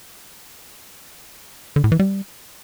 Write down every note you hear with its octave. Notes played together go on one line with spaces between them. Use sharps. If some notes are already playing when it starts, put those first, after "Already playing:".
D3
A2
E3
G3